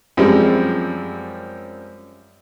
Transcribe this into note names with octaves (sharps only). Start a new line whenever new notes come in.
F#2 F3 G3 G#3 C4